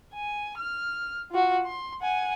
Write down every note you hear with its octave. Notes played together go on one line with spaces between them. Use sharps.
G#5
F6
F4 F#4
C6
F#5 G#5